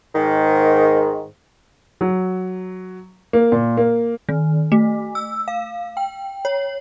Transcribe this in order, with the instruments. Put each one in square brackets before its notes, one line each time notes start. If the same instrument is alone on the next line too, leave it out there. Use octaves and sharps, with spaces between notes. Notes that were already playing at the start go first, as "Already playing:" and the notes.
[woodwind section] G#2 D#3
[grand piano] F#3
A#3
A#2
A#3
[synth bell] D#3
A3
E6
F5
G5
C#5